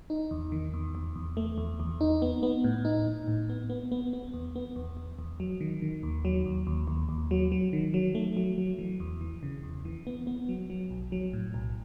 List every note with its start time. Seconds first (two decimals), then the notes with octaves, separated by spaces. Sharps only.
0.10 D#4
0.31 E2
0.52 D#3
0.74 E2
0.95 E2
1.16 E2
1.37 A3
1.58 E2
1.80 E2
2.01 D#4
2.22 B3
2.43 B3
2.64 A2
2.85 D#4
3.07 A2
3.28 A2
3.49 B3
3.70 B3
3.92 B3
4.13 B3
4.34 E2
4.56 B3
4.76 E2
4.97 E2
5.19 E2
5.40 F#3
5.61 D#3
5.82 D#3
6.03 D#2
6.25 F#3
6.46 D#2
6.67 D#2
6.88 D#2
7.09 D#2
7.31 F#3
7.52 F#3
7.73 D#3
7.94 F#3
8.15 A3
8.37 F#3
8.58 F#3
8.79 E3
9.00 E2
9.21 E3
9.43 C#3
9.63 E2
9.85 E3
10.07 B3
10.27 B3
10.49 F#3
10.70 F#3
10.90 B1
11.12 F#3
11.33 A2
11.54 B1